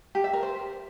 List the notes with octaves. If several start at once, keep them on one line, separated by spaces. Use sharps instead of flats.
G4
E5
A#4
C5